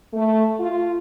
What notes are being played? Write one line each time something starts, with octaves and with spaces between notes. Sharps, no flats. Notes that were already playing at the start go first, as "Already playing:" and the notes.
A3
F4